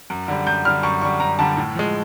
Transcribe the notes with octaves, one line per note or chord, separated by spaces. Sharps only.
F#2
D3 G3
F#2 G6
D3 G3 F6
F#2 C#6
D3 G3 C#6
F#2 A#5
D3 G3 A5
A2
F3 G#3